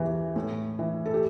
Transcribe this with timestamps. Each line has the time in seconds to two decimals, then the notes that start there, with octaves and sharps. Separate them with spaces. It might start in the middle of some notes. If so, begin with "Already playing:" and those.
Already playing: E2 E3 G4
0.36 A2
0.79 E3
1.06 A4
1.14 G4